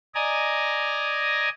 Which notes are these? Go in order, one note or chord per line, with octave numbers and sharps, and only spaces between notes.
D5 D#5 G#5 A#5